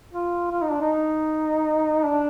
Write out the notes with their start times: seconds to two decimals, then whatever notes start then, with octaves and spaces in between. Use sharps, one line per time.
0.12 F4
0.51 F4
0.62 D#4
0.71 D4
0.82 D#4
2.05 D4